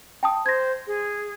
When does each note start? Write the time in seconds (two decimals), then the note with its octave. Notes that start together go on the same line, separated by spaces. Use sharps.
0.23 G5 A5 D#6
0.46 C5 G#6 A#6
0.87 G#4